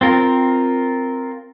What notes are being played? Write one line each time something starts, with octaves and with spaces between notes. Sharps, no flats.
C4 F4 A#4